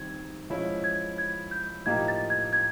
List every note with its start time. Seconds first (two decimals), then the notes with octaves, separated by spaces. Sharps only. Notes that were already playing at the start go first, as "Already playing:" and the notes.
Already playing: D#3 G3 C4 G#6
0.50 F3 G#3 C#4 E4
0.84 G#6
1.18 G#6
1.51 G6
1.86 A2 F3 A#3 D#4 G4 G#6
2.08 A6
2.30 G#6
2.53 G#6